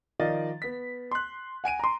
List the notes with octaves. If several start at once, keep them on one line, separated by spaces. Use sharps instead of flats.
D#3 F3 D5 D#5 F5 A6
B3 B6
C6 F#6
F#5 G#5 D7 D#7
A#5 C6